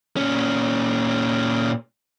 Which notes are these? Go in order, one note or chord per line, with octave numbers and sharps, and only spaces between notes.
A#2 C#4